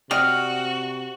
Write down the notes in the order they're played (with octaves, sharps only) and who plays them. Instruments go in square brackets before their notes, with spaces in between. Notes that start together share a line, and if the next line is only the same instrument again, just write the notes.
[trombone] C3 [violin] F#4 [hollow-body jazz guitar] D5 D#5 G5 [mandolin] F6